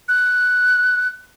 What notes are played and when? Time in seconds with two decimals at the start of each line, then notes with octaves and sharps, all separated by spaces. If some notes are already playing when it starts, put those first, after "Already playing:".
0.08 F#6